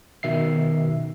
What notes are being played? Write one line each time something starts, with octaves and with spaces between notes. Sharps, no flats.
B2 D#3 E5 C7